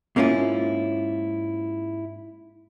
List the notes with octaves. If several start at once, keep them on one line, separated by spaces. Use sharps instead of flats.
G#2 A#3 C#4 E4 F4